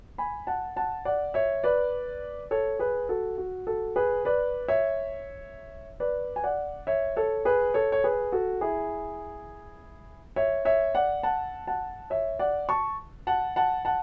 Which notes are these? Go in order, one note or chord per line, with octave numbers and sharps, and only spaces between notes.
G#5 B5
F#5 A5
F#5 A5
D5 F#5
C#5 E5
B4 D5
A4 C#5
G#4 B4
F#4 A4
F#4
F#4 A4
G#4 B4
B4 D5
C#5 E5
B4 D5
G#5
D5 F#5
C#5 E5
A4 C#5
G#4 B4
A4 C#5
C#5
G#4 B4
F#4 A4
E4 G#4
C#5 E5
C#5 E5
D5 F#5
F#5 A5
F#5 A5
C#5 E5
D5 F#5
A5 C#6
F#5 A5
F#5 A5
F#5 A5